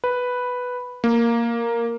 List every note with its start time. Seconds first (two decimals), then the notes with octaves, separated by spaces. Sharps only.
0.04 B4
1.04 A#3